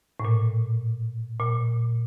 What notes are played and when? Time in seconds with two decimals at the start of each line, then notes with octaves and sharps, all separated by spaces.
0.20 A2
0.25 A#2
1.40 A#2